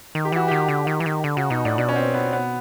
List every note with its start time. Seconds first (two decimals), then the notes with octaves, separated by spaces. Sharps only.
0.15 D#3
0.25 G4
0.32 E3 F#4
0.48 D#3 G4
0.68 D3
0.87 D#3
1.00 E3
1.06 D#3
1.24 D3
1.37 C#3 F#4
1.50 B2 D#4
1.65 A2 D4
1.78 B2 D4
1.89 C#4
1.96 C4
2.14 B3
2.33 B3